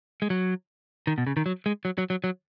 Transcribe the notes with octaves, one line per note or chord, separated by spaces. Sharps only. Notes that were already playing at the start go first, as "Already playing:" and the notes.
G#3
F#3
D#3
B2
C#3
D#3
F#3
G#3
F#3
F#3
F#3
F#3